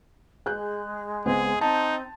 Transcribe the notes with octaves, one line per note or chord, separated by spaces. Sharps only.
G#3 G#4 F#6 G6
C#2 B3 C4 G#4
C4 D#4 A5